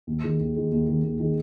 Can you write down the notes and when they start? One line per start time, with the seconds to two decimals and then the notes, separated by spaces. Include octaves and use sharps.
0.07 D#2
0.24 D#3 G#3
0.40 D#2
0.56 D#3 G#3
0.72 D#2
0.88 D#3 G#3
1.04 D#2
1.20 D#3 G#3